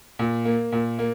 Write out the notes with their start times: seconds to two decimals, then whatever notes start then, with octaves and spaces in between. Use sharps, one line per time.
0.19 A#2
0.45 A#3
0.72 A#2
0.99 A#3